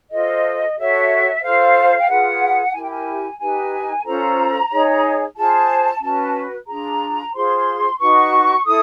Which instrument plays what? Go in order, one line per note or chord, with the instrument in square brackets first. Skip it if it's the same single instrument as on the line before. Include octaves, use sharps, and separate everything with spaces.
[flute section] F4 A4 C5 D#5
F#4 A4 C#5 E5
F4 A4 C5 F5
G5
F4 G#4 B4 F#5
E4 G4 A#4 G#5
G5
G#5
D#4 G4 B4 G#5
C#4 F4 A4 C5 A#5
D#4 G#4 C#5
F4 G#4 C5 A5
C#4 F#4 B4 A5
D4 F4 G#4 A#5
F4 G#4 C5 C6
D#4 F#4 B4 C#6
E4 A4 D#6